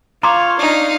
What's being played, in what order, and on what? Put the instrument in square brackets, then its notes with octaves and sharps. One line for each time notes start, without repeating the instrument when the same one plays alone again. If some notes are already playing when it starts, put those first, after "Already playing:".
[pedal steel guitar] F4 C#5 [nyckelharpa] F5 [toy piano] A#5 C6 D6
[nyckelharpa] D4 [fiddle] D#4 F5